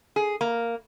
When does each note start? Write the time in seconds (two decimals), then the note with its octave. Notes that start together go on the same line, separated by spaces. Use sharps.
0.16 G#4
0.41 A#3